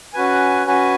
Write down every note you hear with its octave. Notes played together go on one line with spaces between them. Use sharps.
C#4 F#4 B4 G#5
C#4 F#4 B4 G#5